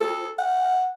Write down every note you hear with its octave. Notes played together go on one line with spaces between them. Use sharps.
A4
F#5